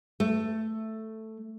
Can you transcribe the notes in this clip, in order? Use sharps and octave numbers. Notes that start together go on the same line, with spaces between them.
A3